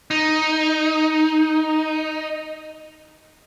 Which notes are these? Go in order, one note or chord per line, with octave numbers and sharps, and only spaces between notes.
D#4